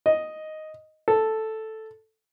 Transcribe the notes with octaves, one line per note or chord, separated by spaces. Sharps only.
D#5
A4